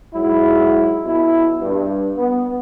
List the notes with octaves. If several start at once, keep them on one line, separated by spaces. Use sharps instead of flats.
G#2 F#3 E4
B1 B2 E4
G2
B3